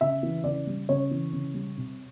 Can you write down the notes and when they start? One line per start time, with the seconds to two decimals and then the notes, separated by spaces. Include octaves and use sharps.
0.01 C#3 E5
0.23 E3
0.44 C#3 D5
0.67 G3
0.89 C#3 C#5
1.11 E3
1.33 C#3
1.54 G3
1.78 C3